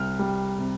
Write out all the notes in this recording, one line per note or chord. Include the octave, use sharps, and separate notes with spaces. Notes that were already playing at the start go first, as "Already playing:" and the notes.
Already playing: C2 F6
G3
C3